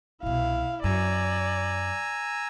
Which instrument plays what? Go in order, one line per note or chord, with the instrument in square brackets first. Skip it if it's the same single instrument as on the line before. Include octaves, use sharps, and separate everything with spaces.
[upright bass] C2 B2 [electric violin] E4 F5
[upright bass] F#2 [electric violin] D5 [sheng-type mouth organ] G#5 A#5 E6